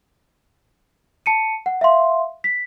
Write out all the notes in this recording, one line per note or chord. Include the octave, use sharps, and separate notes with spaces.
A5 C#7 D#7
F#5
E5 F5 C6
B6